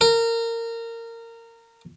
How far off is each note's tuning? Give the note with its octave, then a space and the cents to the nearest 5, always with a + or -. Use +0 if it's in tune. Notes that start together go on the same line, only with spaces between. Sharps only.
A#4 -20